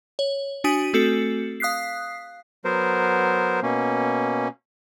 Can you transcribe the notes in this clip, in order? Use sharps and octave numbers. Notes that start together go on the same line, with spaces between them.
C#5
D4 F#4 G#5 D#6 B6 D#7
A3 C4 F#4 A4 C#7
F5 D#6 F#6 B6 C7
F#3 B3 A#4 C5
B2 A#3 C#4